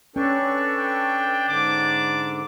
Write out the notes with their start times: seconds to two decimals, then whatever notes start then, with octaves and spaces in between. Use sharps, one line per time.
0.16 C#4 D4 A4 B4 G5 C#6
0.77 G5
1.48 G#2 D3 D6